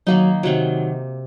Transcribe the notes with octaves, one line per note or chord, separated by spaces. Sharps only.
D#3 F#3 A#3 D#4
C3 D#3 F#3